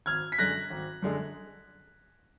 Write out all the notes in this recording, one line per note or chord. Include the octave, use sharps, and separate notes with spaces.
G#1 F6 G#6
B6
F#2 D3 G#3 F#6 A#6
G#1
F#2 D3 G#3